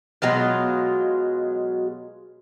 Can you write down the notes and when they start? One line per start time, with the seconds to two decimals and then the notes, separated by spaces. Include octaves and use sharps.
0.22 B2 F#3 G#3 F4